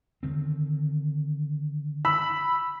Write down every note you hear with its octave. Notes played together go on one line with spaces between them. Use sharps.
D3 D#3 C4
B5 E6